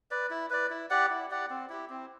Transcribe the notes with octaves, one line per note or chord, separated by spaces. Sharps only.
B4 D5
E4
B4 D5
E4
G4 D5 F#5
E4
G4 D5 F#5
C4
E4 G4
C4